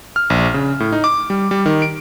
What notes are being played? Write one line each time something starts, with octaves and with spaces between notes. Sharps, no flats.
F6
A#1
C#3
A2
D#4
D6
G3
G3
D#3
D7